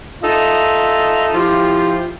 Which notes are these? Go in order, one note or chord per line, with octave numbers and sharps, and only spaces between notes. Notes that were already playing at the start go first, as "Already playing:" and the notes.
D#4 F4 A4 D#5 E5
F3 E4 F4 G4